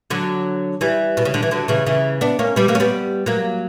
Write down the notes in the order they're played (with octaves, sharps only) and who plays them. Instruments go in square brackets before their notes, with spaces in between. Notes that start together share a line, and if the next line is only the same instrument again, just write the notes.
[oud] D3 F#3
E3 G3
B2
C#3
D3
E3
D3 F#3
C#3 E3
C#3 E3
B3 D4
A#3 C#4
G3 B3
F#3 A#3
C#4
G3 B3
F#3 A#3